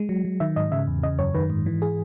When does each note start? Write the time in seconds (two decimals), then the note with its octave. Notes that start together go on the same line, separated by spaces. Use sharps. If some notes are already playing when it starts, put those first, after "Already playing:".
Already playing: G#3
0.09 F#3
0.25 F#3
0.40 D#3 E5
0.56 G#2 D#5
0.71 C#3 E5
0.87 E2
1.03 C#3 D#5
1.19 F#2 C#5
1.35 D#3 B4
1.50 G#2
1.66 E3
1.82 G#4